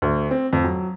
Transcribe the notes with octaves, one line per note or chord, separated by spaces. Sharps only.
D2
C4
F2
F#3